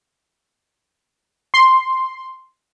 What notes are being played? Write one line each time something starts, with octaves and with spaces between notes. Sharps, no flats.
C6